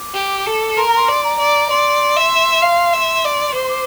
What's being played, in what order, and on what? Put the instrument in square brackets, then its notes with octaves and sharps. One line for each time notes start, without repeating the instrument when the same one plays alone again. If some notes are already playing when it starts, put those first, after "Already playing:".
Already playing: [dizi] D6
[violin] G4
A4
[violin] A#4 [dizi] C6
[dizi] A#5
C6
[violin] D5
[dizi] A#5
[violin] D5
[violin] D5 [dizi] C6
[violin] E5
F5
E5
D5
[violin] C5 [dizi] D6
[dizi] C6
D6